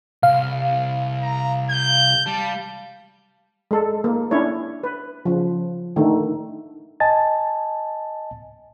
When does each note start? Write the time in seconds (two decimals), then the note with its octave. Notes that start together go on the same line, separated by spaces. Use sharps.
0.23 C2 F5
1.22 A#5
1.71 G6
2.26 G3 A5
3.71 G#3 A4
4.04 A#3
4.31 C#4 D4 E4 C#5
4.83 B4
5.25 C#3 F3
5.96 D3 D#3 A3
7.00 D#5 G#5 A5 A6